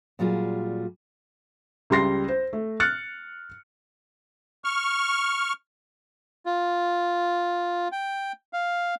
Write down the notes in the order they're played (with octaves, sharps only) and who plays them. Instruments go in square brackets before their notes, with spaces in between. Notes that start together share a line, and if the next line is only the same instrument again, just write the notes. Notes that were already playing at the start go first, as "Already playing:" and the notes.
[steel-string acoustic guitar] A#2 F#3 G3 F4 G#4
[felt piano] C#2 G3 C6 A#6 C7
C5
A3
F6 F#6 A6 C#7
[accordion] C#6 F6
[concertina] F4
G5
F5